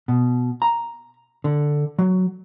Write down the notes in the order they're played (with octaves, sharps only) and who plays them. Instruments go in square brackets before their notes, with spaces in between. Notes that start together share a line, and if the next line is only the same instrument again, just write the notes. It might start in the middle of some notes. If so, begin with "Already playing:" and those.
[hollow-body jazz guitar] B2
A#5
D3
F#3